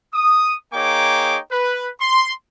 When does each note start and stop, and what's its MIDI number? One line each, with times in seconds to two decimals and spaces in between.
0.14 0.55 87
0.74 1.38 58
0.74 1.38 63
0.74 1.38 68
0.74 1.38 73
0.74 1.38 79
0.74 1.38 86
1.52 1.89 71
2.01 2.32 84